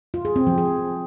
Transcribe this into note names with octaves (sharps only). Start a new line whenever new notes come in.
F4
G#4
C4
F3
G#4